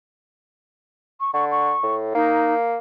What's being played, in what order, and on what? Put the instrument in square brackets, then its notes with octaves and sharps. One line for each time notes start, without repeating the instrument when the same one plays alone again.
[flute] C#6
[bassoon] D3 [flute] C#6
[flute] C#6
[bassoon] A2
[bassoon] A#3 [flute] D#4